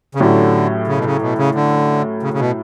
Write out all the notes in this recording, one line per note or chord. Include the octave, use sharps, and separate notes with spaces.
C#3
A2 D3 F#3 C#4 G4
C#3
B2
C#3
B2
C#3
D3
C#3
C#3
B2